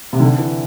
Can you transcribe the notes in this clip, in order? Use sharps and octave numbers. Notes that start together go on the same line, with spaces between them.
C3
D3
E3